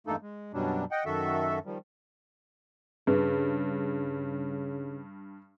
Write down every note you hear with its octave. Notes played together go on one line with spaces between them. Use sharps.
E2 G2 A3 A#3 D#4 A4
G#3
F#2 B2 F#3 G3 D4
D#5 F#5 G5
F#2 D#3 F#4 A4 E5
D#3 F3 G3
G2 C#3 G#4 B4